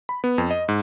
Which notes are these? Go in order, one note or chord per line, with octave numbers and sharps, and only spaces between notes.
B5
B3
F2
D#5
G#2